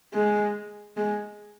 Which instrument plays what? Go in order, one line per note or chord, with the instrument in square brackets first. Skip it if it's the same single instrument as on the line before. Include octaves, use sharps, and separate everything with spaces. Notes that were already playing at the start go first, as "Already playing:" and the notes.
[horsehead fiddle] G#3
G#3